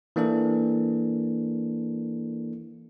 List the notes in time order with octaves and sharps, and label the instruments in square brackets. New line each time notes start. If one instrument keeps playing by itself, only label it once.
[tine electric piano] E3 A#3 D4 A4